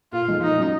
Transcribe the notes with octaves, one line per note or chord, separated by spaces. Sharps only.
A#2 F4
F3 G#3 D#4
A#2 D#4
F#3 C#4